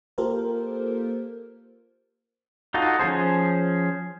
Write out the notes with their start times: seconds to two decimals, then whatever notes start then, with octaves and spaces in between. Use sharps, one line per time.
0.18 A#3 F4 G4 A4 A#4 C5
2.74 D#4 F4 F#4 A4 D#5
2.99 F3 C#4 G#4 C5